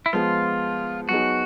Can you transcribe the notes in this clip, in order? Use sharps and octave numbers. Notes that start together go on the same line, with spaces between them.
E4
F3 G#3 B3 F4
F#3 B3 D#4 F#4 G#4